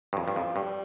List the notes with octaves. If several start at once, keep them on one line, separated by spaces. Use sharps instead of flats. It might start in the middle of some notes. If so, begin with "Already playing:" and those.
G2
F2 F3
G2
F2
G2 G3